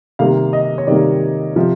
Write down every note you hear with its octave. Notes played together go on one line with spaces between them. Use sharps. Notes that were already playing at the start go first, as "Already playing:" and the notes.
C3 D#3 G3 A#3 F5
D#5
C#5
C3 D#3 G3 A#3 D5
C3 F3